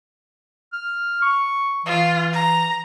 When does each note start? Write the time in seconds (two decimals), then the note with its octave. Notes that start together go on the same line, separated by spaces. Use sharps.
0.73 F6
1.22 C#6
1.86 E3 F4
2.33 A#5